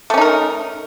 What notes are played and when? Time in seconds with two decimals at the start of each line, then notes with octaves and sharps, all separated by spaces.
0.10 A3
0.14 C#4
0.18 D#4
0.21 A#4